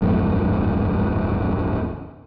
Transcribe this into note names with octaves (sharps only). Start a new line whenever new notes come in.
D1 G1 F2 G#2